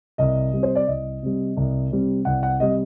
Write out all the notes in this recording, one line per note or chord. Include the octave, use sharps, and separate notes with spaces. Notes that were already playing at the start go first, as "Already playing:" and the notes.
C2 D#5
C3 G3
C5
D5
C2 D#5
C3 G3
C2
C3 G3
C2 F#5
F#5
C3 G3 D#5